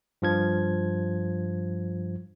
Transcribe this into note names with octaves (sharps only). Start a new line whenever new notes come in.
G2 F3 G#6